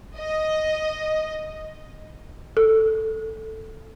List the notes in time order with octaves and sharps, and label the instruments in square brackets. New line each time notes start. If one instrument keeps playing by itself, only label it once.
[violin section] D#5
[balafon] A4